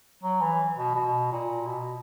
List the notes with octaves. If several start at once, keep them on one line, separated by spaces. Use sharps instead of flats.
F#3
E3
B2
B2
A#2
B2